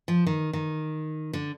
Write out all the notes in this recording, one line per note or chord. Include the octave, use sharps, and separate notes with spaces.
F3
D#3
D#3
D3